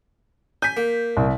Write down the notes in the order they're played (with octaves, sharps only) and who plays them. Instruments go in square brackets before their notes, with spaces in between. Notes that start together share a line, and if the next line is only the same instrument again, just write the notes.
[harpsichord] G#5 [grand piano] G6 B6
[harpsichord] A#3
[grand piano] C2